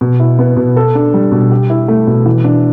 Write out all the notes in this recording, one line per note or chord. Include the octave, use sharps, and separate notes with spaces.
B2
E4
B3
B2
A4
D4
G3
B2
G4
E4
A3
B2
E3
D4